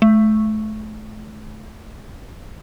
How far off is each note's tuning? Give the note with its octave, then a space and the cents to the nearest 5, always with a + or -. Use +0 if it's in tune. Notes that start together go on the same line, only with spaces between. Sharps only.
A3 -35